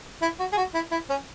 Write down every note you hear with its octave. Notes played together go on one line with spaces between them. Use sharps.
E4
F#4
G#4
F#4
E4
E4
C#4